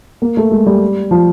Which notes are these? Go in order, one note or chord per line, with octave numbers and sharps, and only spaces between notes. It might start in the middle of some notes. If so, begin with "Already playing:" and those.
A#3
A3
G#3
G3
F3